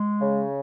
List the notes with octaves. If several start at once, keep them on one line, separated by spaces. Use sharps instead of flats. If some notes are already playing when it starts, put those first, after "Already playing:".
Already playing: G#3
C#3